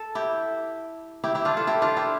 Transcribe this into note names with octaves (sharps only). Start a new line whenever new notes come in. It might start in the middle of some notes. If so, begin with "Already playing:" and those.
Already playing: A4
E4 G4
E4 G4
E4 G4
D4 F4
F4 A4
E4 G4
D4 F4
E4 G4